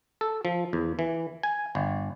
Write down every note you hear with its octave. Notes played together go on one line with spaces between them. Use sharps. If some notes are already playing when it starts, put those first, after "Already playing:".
A4
F3
E2
E3
G#5
G1